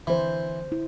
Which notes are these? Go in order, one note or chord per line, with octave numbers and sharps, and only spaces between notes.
D3 E3 C5
E4